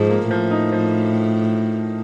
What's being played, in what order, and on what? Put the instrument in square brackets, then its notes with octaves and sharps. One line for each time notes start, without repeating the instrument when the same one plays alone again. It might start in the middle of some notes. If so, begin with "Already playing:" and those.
Already playing: [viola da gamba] G#2 [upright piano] F3
[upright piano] A#3
[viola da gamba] A2 [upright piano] F3
[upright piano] D#4
F3